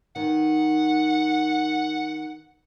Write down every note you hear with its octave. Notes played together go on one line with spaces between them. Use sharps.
D#3 F#5